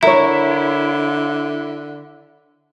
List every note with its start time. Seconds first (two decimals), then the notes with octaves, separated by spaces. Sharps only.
0.03 D3 E4 A#4 C#5 E5